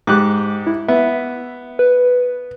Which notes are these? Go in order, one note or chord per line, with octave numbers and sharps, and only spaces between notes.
G#2 G4 D6 F#6
E4
B3 E5
B4